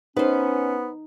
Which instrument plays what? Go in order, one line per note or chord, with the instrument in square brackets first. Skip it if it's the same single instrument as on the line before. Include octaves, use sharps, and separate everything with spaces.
[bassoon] B3 [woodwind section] C#4 [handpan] D#4 [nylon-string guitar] B4 C5